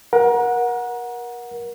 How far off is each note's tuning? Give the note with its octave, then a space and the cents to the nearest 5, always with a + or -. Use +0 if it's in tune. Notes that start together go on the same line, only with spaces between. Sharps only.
A#4 +30 F#5 -15